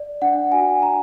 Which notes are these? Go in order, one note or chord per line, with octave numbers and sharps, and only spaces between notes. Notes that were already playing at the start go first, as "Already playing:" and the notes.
Already playing: D5
D4 F#5
F#4 G#5
D4 A#5